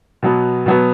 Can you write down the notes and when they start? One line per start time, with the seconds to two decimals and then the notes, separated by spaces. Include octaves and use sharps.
0.23 B2 F#3 B3
0.66 B2 F#3 B3